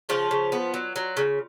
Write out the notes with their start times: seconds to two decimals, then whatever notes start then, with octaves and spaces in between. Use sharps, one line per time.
0.09 C#3 F3 F4
0.31 C#3
0.52 B3
0.74 F#3
0.96 F#3
1.17 C#3